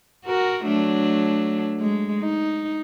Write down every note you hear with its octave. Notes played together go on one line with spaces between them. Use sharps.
F#4 A#4
F#3 A3 D4
G#3
D#4